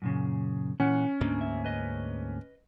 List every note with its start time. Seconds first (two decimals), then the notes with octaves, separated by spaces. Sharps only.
0.02 F#2 A#2 C#3
0.80 A#2 E3 C#4 F#5
1.21 D2 G#2 A#3 D4
1.41 E5
1.64 B4 D#5